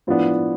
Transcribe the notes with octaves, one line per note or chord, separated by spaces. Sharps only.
A2 F3 B3 D4